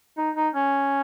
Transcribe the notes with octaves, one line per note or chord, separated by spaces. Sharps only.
D#4
D#4
C#4